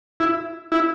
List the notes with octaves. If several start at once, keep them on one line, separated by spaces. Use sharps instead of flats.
E4
E4